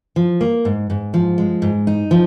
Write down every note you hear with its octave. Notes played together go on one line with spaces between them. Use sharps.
F3
A#3
G#2
G#2
F3
G#3
G#2
D#4
F3